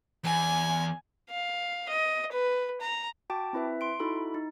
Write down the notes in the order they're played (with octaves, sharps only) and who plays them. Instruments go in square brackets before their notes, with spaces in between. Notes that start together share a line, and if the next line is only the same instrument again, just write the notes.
[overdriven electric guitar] E2 [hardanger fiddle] G#5
[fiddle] F5
D#5
B4
A#5
[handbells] F#4 G5 A5 D6
C4 E4 B4 E5
C6 D7
D#4 E4 F#4 A4 B5
D#4